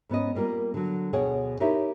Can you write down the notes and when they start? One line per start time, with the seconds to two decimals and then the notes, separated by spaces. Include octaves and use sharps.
0.09 G#2 B3 C#4 D#5
0.35 G3 A#3 F4 A#4
0.74 D3 F#3
1.13 D2 B2 G#4 C#5 F#5 G5
1.60 D#4 E4 G4 A#4 C#5 E5